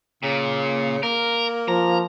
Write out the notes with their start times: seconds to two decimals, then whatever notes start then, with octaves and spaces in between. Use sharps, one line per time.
0.23 A#2 C#3
1.03 A#3 A#4
1.68 F3 A#5